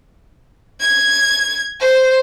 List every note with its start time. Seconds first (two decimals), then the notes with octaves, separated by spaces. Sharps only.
0.81 G#6
1.81 C5